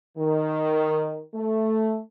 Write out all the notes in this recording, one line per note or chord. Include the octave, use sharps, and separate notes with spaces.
D#3
A3